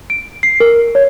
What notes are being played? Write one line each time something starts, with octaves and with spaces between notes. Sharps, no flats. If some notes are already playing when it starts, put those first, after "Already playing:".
D7
C7
A#4
C#5